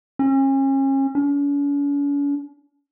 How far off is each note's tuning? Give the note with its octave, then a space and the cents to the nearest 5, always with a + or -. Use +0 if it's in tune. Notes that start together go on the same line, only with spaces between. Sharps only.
C#4 -35
C#4 +45